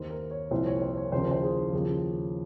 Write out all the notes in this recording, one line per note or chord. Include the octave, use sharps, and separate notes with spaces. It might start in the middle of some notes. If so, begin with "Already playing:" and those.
Already playing: D#2 D#3 C5
A#4
C#5
C2 A#2 F3 C5
C#5
C5
C#5
D#2 C#3 F3 C5
A#4
C5
G#4
D#2 C#3 F3 G#4